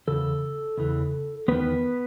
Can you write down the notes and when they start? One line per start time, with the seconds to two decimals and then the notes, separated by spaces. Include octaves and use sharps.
0.07 E2 C#3 A4
0.78 E2 C#3 E3
1.48 E2 D#3 B3 B4